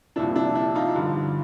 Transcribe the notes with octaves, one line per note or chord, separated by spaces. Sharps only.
C2 A#2 F3 D4 E4
D4 E4
D4 E4
D#4 F4
G2 D3 F3